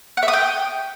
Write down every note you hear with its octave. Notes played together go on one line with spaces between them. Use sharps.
F#5
E5
D#6
G5